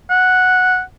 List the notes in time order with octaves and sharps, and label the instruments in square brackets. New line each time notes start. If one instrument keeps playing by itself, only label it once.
[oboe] F#5